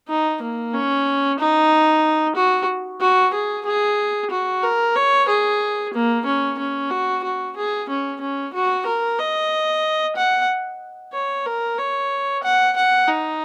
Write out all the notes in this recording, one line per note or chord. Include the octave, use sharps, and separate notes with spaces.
D#4
A#3
C#4
D#4
F#4
F#4
G#4
G#4
F#4
A#4
C#5
G#4
A#3
C#4
C#4
F#4
F#4
G#4
C#4
C#4
F#4
A#4
D#5
F#5
C#5
A#4
C#5
F#5
F#5
D#4